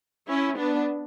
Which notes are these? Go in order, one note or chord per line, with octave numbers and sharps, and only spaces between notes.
C#4 E4
B3 D4